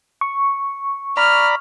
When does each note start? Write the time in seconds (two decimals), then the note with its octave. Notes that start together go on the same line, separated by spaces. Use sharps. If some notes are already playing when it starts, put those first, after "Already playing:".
0.21 C#6
1.17 D5 A#5 B5 F6